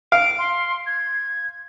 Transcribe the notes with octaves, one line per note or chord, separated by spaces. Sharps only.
F5 D7
C6
G#6